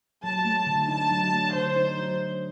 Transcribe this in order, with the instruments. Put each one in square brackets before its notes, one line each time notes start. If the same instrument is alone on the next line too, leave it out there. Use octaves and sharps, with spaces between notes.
[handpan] F#3 [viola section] A5
[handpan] A3
D3
[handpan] D#4 [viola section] A5
[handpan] F#3
A3
[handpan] D3 [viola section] C5
[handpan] D#4
F#3